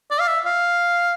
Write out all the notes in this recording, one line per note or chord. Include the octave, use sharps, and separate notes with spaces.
D5
F5
E5
F5